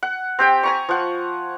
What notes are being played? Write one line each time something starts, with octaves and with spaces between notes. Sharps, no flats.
F#5
C4 G4 G5
G#5 A#5 C#6
F3 F#5